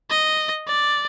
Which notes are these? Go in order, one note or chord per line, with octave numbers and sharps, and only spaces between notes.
D#5
D5